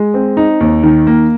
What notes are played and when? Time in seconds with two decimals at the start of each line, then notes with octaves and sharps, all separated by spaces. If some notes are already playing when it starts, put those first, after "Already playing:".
Already playing: G#3
0.14 C4
0.37 D#4
0.60 D#2
0.84 D#3
1.07 A#3